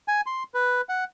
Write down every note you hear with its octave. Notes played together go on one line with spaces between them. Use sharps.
G#5
C6
B4
F#5